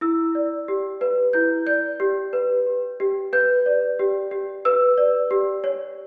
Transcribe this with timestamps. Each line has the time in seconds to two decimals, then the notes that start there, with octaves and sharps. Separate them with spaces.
0.01 E4 E6
0.35 D5
0.68 G4
1.01 B4
1.33 E4 G6
1.66 D5 G6
2.00 G4
2.33 B4
2.66 G4
3.00 G4
3.33 B4 G6
3.66 D5
3.99 G4
4.31 G4
4.65 B4 E6
4.98 D5
5.31 G4
5.64 C#5